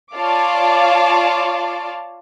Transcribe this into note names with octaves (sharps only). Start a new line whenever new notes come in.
F4 C#5 D5 F5 A5 D6